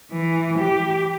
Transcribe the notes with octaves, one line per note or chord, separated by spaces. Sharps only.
E3
G4